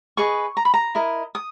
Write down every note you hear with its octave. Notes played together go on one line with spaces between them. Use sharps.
G#4 B4 D#5 C#6
A#5
B5
A#5
E4 A#4 D#5
D#6